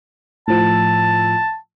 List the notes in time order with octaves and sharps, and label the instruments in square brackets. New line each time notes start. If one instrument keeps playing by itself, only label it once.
[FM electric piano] A2 F3 E6 [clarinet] A5